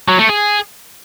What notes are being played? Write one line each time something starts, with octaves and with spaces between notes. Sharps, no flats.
F#3
A3
G#4